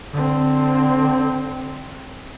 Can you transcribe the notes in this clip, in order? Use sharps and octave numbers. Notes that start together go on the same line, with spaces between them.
D3 C4